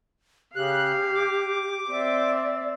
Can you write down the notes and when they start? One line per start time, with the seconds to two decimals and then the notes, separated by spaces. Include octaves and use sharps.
0.56 C#3 G4 F5 F#6
1.14 D6
1.90 C4 D5 E5